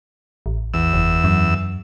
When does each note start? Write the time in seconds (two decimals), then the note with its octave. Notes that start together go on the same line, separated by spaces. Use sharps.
0.46 A1
0.74 E2 E6
0.93 F#1
1.24 F#2